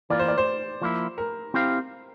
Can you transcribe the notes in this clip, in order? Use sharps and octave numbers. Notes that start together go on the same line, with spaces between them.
E3 A#3 F4 D5
C5
D5
C5
F3 A#3 E4
A#4
C4 E4 G4 C5 F5